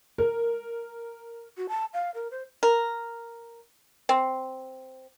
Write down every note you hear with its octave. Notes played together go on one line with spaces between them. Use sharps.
A#4
F#4
A5
F5
A#4
C5
A#4
C4